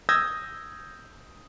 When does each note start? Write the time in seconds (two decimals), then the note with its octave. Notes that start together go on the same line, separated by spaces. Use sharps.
0.09 D#6 E6 G6 G#6 A#6